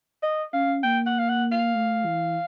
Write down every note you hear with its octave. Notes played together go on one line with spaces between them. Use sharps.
D#5
C#4 F5
A#3 G5
F#5
F5
F#5
F5
A3
E3